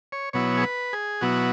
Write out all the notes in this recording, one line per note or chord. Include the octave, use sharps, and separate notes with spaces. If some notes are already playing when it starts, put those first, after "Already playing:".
C#5
B2 F#3 B3 E4 C#5
G#4
B4
G#4
B2 F#3 B3 E4 F#4